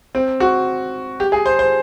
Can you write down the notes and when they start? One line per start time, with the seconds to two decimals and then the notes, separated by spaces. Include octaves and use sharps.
0.15 C4
0.40 F#4
1.20 G4
1.32 G#4
1.46 C5
1.59 C5